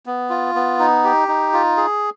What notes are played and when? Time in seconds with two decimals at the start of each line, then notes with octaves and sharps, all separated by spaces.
0.06 B3
0.30 F4
0.55 B3
0.79 D#4
1.04 G4
1.28 D#4
1.53 F4
1.77 G#4